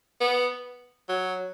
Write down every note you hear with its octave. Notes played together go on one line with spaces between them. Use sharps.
B3
F#3